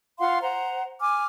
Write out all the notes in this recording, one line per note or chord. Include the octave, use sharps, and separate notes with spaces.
F4 F5 F#5 C6
C5 F#5 A#5
G#5 D6 F6